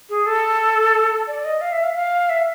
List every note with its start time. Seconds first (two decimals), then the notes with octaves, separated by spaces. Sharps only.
0.09 G#4
0.26 A4
1.27 D5
1.44 D#5
1.61 F5
1.72 E5
1.83 F5
1.96 F5
2.29 E5